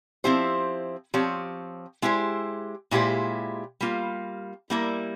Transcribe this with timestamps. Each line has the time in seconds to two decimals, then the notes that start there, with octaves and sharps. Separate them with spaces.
0.24 F3 C4 E4 G4 C5
1.14 F3 C4 G4 C#5
2.02 G#3 E4 G4 C5
2.91 A#2 G#3 E4 G4 C5
3.80 G3 A#3 F4
4.70 G3 A#3 E4 A#4